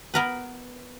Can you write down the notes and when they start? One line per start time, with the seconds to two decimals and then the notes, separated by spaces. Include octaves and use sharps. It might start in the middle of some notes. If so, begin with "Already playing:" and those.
0.14 B3 A#4 B4